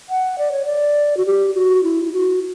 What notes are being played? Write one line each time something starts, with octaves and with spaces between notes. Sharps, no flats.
F#5
D5
C#5
D5
F#4
G4
F#4
E4
E4
F#4